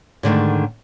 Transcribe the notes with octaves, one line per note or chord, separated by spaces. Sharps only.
G#2 D3 D#3 A3